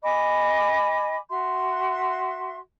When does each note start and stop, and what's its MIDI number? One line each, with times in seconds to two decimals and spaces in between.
0.03 1.16 75
0.03 1.16 80
0.03 1.16 83
0.03 1.16 86
1.30 2.56 66
1.30 2.56 76
1.30 2.56 84